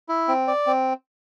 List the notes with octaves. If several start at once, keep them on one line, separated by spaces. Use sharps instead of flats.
E4
C4
D5
C4